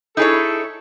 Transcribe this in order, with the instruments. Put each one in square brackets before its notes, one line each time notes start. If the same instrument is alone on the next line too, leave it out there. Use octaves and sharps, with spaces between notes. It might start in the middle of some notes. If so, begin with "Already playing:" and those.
[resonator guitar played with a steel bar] D#4 G#4 C#5 [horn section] E4 A4